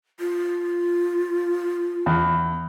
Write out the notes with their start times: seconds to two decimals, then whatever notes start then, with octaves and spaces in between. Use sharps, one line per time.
0.20 F4
2.06 E2